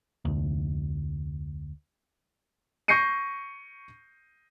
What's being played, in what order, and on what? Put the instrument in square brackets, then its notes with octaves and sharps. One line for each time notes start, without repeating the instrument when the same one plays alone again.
[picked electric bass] F1 D2
[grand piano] C#6 G6 A#6 C7 C#7 D#7